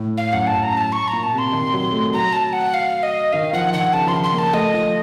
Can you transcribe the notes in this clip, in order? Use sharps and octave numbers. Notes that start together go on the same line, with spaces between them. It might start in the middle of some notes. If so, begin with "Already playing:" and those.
Already playing: A2
F5
F#2 F#5
A5
F#2
A#5
A5
C#6
A#5
A#2
A5
C3
C6
D#3
F#3
A3
F#3 A#5
A5
F#5
F5
D#5
D#3 F5
F3 F#5
D#3 F#5
C#3 A5
F3 C6
D#3
C6
A#3
A5
A3 D#5
F3